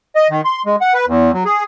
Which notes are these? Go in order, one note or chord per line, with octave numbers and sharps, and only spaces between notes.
D#5
D#3
C6
G#3
F#5
B4
E2
F#3
G#4